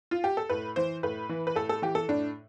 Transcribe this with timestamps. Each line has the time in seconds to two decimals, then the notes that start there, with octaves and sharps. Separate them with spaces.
0.11 F4
0.24 G4
0.37 A4
0.50 A2 B4
0.76 E3 C5
1.03 A2 B4
1.29 E3
1.47 B4
1.55 A2 A4
1.69 A4
1.82 E3 G4
1.95 A4
2.08 A2 D4